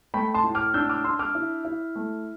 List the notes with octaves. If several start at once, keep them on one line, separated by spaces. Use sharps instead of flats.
A3 G5 B5
A5 C6
A2
D6 F6
D4 E6 G6
D6 F6
D4 C6 E6
D6 F6
E4
E4
A3